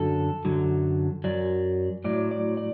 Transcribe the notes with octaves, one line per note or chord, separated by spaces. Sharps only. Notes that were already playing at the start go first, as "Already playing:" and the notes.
Already playing: F#2 D3 F#3 A4
F#2 D3 F#3
F#2 F#3 D5
A2 F#3 D5
D5
D5